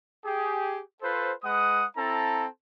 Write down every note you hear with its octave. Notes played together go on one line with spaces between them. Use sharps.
G4 G#4
F4 A4 B4 C5
G#3 B4 F#5 D#6
C4 E4 A4 A5 A#5